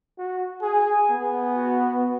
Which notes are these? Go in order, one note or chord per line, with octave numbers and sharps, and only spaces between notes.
F#4
G#4 G#5
B3
F#4